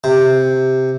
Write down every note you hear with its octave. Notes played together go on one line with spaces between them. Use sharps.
C3